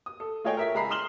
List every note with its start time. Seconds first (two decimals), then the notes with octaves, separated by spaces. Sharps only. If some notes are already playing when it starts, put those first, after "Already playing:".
0.06 D#6
0.20 A4
0.44 A3 F4 G#4 C#5 D#5 G5
0.57 A#4 E5 B6
0.74 C#2 G#4 A#5 B5 C7
0.90 C6 D#6 F6 E7 F#7 G7